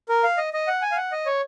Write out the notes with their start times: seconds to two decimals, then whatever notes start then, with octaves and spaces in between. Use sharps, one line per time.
0.09 A#4
0.24 F5
0.38 D#5
0.53 D#5
0.67 F#5
0.82 G#5
0.92 F5
0.97 F#5
1.12 D#5
1.26 C#5